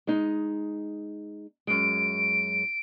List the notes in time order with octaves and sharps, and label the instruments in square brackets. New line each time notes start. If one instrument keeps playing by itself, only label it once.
[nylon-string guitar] G#3 D#4
[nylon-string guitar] F#2 G#3 [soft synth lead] D7